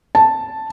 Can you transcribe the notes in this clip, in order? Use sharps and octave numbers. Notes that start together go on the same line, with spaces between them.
A5